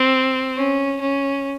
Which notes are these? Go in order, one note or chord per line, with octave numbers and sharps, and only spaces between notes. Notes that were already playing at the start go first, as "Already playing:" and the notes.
Already playing: C4
C#4
C#4